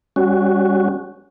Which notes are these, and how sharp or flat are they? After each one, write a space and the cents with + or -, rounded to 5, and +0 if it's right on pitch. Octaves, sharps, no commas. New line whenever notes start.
G3 +20 C#4 +0 F#4 +0